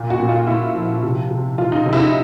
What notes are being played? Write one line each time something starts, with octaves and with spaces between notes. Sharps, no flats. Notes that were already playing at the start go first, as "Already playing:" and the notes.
Already playing: A#2
F#4
A#2
F4
A#2 E4
F3
C3
C3
E3 F4
D#4
C3
E4
D#4